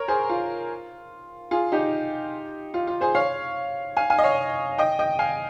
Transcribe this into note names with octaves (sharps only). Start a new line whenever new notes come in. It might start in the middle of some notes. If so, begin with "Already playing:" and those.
Already playing: A#4 C#5
G#4 C5
F4
F4 G#4
D#4 G4
F4
F4
G#4 C5
C#5 F5
F5 G#5
F5 G#5
D#5
C#5 F5
D#5 G5
D#5 G5
F5 G#5